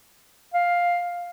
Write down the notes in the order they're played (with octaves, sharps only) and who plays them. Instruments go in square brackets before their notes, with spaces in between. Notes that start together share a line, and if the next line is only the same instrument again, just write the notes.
[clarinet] F5